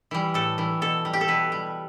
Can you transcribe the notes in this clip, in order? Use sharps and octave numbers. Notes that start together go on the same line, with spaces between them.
E3 G3
A2 A4
E3 G3
B2 A4
G3
G4
A4
B2 B4
G3